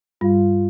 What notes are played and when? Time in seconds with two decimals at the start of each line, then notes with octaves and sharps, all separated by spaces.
0.21 G2 G3 F4